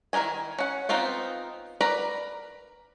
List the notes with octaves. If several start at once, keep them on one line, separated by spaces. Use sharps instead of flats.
D#3 E4 A#4 D#5 G#5
C#4 F#5
B3 C4 D#4 F4 C5
A#4 B4 D5 A#5 B5